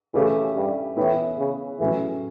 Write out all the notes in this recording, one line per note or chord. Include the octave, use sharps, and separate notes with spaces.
C#3 E3 A3 C#4 G4
G2
A2 E3 B3 E4 B4
C#3
A2 E3 F#3 C#4